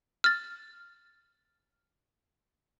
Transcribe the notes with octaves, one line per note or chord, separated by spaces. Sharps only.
F6 A6